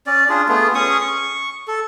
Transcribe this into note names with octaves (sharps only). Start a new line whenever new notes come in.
C#4 D5
D4 F4 G#4
A3 B3 F4 G#4
C#4 G#4 C#6 D#6
C#6
A4